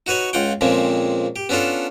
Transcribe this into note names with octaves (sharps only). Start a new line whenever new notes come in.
D#4 F#4 B4 C#5
C#2 F4 F#5 G5
F2 A#2 C#3 G#3 C4
G4
B3 C#4 D4 F4 A4